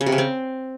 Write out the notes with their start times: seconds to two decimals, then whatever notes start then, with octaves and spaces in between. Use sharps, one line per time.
0.01 C#3
0.06 C3
0.12 C#3
0.18 C4